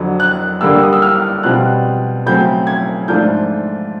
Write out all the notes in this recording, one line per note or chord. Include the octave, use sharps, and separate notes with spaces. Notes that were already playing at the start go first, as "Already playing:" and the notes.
Already playing: F2 D3 F#3
F#6
G2 D3 G3 A#3 E6
D#6
E6
F6
B2 G3 C4 F4 F#6
C#3 F#3 A3 C4 G6
G#6
G#2 F3 A3 D4 F4 G6